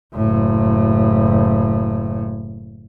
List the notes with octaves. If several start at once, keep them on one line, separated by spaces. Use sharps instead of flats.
F#1 A2